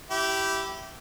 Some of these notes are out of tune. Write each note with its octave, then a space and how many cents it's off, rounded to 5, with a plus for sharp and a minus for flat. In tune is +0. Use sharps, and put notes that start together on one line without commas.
E4 +0 G4 -15